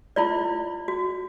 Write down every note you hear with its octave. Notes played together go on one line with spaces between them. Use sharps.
E4 F4 D5
F#4